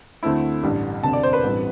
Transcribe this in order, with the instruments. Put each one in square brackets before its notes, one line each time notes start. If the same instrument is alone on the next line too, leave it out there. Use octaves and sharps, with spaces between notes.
[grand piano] D2 D3 A3 C4 E4
A1 G2 D3 G3
E1 D2 C3 A5
D5
C5
B4
A1 G2 E3 G3 C4